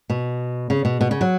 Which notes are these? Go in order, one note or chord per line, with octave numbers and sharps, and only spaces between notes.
B2
C#3
B2
B2
C#3
F#3